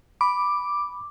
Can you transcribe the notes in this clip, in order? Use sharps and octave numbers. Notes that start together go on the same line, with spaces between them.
B5 D6